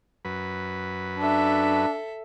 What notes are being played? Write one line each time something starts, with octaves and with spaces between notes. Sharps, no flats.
F#2 B4
D4 A4 E5